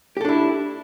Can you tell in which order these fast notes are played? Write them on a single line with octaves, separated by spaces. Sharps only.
G4 A4 D4 E4